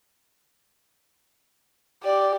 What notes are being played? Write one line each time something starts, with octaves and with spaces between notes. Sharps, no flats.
G4 D5